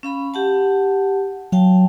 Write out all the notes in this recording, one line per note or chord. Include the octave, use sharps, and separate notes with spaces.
C#4 F5 B5
G4 F#5 A5
F#3 F5 G5 A5